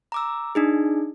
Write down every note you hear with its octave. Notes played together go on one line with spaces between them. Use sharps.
A#5 D6 E6
D4 D#4 G#4